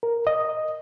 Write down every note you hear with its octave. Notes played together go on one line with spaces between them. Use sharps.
A#4
D#5